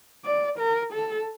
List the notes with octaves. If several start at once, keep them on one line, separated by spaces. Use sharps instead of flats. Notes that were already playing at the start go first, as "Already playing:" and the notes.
D5
A#4
A4